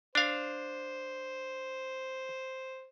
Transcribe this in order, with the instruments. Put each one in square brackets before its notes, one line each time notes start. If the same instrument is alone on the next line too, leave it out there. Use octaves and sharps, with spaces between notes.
[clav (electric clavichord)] D4 F5 [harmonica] C5